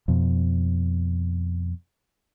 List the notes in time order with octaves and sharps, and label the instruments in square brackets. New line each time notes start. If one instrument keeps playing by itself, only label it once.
[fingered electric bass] F2 B2